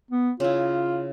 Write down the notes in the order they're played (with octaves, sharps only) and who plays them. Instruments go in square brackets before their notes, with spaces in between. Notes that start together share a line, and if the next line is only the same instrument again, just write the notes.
[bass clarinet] B3
[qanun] C#3 E4 [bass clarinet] F4